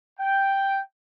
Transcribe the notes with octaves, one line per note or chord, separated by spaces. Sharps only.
G5